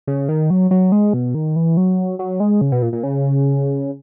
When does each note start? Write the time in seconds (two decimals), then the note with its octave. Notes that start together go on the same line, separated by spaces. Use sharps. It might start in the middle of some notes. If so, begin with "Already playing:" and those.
0.07 C#3
0.29 D#3
0.50 F#3
0.71 F#3
0.92 G#3
1.14 B2
1.35 D#3
1.56 E3
1.77 F#3
2.19 F#3
2.40 G#3
2.61 C#3
2.72 B2
2.82 A#2
2.93 A#2
3.03 C#3